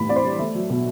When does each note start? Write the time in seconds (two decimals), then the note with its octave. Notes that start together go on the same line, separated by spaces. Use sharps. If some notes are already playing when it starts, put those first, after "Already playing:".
Already playing: A2 E3 G3 B5
0.09 C4 D5
0.16 C5
0.24 G3
0.39 A3
0.55 F#3
0.70 B2